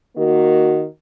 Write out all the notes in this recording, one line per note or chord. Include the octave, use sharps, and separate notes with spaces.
D#3 A#3 F#4